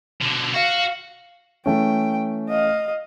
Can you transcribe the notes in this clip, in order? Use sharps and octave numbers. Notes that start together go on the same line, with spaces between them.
B2 D3
F#4 F5
E3 A3 C#4 G5
D#5 F5